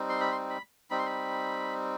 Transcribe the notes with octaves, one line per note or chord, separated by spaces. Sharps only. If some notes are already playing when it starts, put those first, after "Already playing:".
Already playing: G3 C4 D#4
C6
B5
C6
B5
G3 C4 D#4 B5
C6
B5